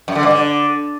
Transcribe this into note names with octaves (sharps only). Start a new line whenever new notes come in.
F#2
D3
G2
D3